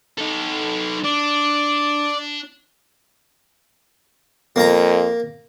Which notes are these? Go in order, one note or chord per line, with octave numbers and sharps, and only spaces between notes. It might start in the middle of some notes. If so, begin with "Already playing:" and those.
D#4 A4
D4 D5
F2 A#3 A#5